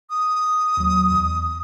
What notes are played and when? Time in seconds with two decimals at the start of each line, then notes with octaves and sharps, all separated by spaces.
0.10 D#6
0.77 D#2 F#3
1.11 E2